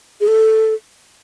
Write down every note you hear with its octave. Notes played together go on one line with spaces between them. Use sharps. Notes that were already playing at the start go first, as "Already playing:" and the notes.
G#4
A4